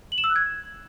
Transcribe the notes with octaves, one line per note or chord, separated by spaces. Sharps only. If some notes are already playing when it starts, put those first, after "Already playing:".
F#7
E7
E6
F#6
G#6